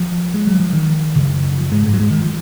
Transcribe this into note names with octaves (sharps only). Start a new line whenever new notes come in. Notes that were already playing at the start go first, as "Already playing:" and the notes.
Already playing: F3
G#3
F#3
F3
D#3
F#2 C#3
F3
G#2 G#3
G#2 G#3
F#3
G#2 G#3
D#3
F3